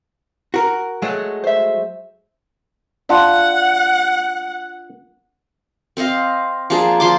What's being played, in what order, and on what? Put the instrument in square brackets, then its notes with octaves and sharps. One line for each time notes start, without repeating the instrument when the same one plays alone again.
[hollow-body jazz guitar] F#4 A#4
F#3 G#3 A3
[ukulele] C5 E5
[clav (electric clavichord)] D4 F4 [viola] F#5
[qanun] C4 C5 D#5 F5
F3 A#3 D4 G#4
F3 C6 D6